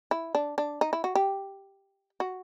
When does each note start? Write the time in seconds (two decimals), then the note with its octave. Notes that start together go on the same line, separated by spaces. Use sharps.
0.11 E4
0.35 D4
0.58 D4
0.81 D#4
0.93 E4
1.04 F#4
1.15 G4
2.20 F#4